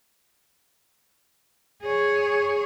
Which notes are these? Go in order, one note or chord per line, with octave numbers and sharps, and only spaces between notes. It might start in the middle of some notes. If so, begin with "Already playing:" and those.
G#4 C#5